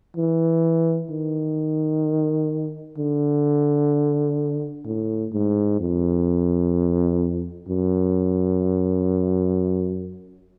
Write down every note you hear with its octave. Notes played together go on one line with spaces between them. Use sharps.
E3
D#3
D3
A2
G#2
F2
F#2